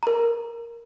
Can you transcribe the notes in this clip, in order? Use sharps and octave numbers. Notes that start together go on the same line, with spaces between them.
A#4 A#5